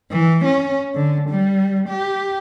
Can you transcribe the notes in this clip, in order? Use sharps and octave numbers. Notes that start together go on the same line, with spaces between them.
E3
C#4
D3
G3
G4